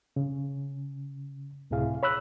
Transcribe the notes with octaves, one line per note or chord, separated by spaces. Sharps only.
C#3
C#2 A2 C3 E4 G#4 F5
C#5 B5 E6 F#6